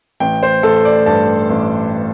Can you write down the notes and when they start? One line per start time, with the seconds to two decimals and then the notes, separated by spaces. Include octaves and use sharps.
0.20 A1 G5
0.43 C5
0.63 A1 A4
0.85 D5
1.06 G2 A5
1.50 A1